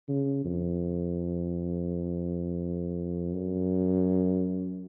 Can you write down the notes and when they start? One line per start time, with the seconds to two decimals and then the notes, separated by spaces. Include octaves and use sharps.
0.08 C#3
0.45 F2
3.34 F#2